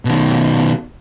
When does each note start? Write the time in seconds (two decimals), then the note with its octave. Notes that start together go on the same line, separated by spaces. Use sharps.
0.05 B2 D#3